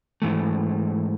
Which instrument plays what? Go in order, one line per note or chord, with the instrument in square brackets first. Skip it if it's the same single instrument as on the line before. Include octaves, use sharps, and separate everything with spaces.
[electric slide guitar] G#2 E3 A3